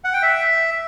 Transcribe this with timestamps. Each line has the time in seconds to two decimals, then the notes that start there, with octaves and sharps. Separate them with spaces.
0.04 F#5
0.13 G5
0.22 E5